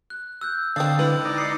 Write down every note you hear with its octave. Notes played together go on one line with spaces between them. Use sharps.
F#6
E6 F#6 G6
D3 C4 D4 F5 D#6
G#3 E4 B4 E6 F#7
D#4 D5
C7 C#7